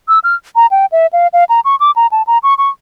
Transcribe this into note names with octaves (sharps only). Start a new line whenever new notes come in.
E6
F6
A#5
G5
E5
F5
F5
A#5
C#6
D6
A#5
A5
A#5
C#6
C#6